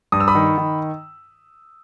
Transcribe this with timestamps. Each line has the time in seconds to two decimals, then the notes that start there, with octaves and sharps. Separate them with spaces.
0.12 G2 D#6
0.20 E6
0.28 B5 D#6
0.35 D#3
0.58 D#3